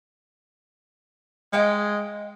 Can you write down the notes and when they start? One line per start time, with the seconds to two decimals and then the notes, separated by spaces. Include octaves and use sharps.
1.53 G#3 D#5 F5 G5